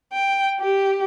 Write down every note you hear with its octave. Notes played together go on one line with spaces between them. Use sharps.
G5
G4